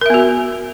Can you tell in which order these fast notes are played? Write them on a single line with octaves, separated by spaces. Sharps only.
A#4 E5 B3 F#4